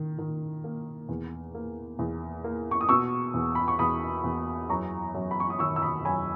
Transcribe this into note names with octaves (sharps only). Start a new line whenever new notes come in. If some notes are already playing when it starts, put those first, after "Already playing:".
Already playing: D#3
D#3
A#3
E2
A#3
E2
A#3
C#6
D#6
B2 C#6 E6
E2
B5
C#6
E2 B5 D#6
E2
F#2 A#5 C#6
F#2
B5
C#6
D#6
D#3 C#6 E6
E6
B5 D#6
F#2 G#5 B5